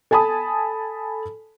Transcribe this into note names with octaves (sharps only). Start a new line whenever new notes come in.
A4 G#5 A5 B5 D#6